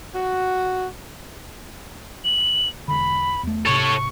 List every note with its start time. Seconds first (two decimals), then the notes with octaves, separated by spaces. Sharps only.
0.13 F#4
2.25 F#7
2.88 E1 D3 B5
3.43 E2 A3
3.66 G#2 C3 A4 C#5 C#6